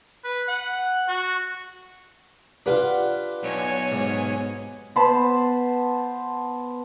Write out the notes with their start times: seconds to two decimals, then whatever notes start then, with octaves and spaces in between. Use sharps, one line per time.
0.24 B4
0.48 F#5
1.08 F#4
2.66 D4 F4 G4 B4 F5 F#5
3.43 B1 C#5 G#5
3.92 G#2
4.96 B3 C5 A5 B5